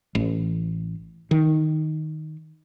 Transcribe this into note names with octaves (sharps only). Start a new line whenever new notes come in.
A1
D#3